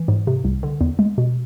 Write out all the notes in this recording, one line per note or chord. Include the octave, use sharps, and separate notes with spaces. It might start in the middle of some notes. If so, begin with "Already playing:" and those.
Already playing: E3
G#2
C3
C2
D3
E2
G#3
B2